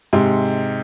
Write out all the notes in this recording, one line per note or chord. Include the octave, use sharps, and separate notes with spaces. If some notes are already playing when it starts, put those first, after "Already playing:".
G#2 C3